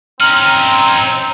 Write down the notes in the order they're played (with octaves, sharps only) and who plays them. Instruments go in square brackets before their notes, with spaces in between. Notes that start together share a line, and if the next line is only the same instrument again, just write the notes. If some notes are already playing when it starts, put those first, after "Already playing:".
[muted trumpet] C4 [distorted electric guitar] C#4 D#4 [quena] A#5 [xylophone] F6 F#7